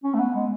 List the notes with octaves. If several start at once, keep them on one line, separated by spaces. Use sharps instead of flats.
C#4
A3
B3
G#3